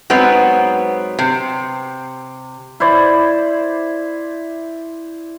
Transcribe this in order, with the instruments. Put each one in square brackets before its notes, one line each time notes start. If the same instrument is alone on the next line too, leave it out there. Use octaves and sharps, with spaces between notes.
[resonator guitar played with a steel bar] G#2 F#3 B3 C4
C3
[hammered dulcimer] E4 C5 D5